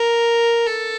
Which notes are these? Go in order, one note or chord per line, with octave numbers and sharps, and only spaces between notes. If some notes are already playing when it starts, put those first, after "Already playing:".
Already playing: A#4
A4